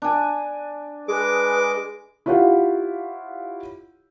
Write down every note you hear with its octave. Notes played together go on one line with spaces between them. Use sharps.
D4 G#5
G#3 G#4 B4 D6
E4 F4 G4 C#5 F5 F#5